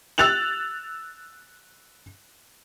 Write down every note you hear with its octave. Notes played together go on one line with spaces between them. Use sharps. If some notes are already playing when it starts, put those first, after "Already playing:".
E6 F#6 A6 F7 F#7